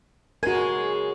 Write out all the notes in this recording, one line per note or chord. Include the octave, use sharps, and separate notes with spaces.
C#3 G#3 F#4 A#4 G#5